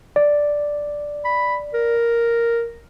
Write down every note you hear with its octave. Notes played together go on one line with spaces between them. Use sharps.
D5
B5
A#4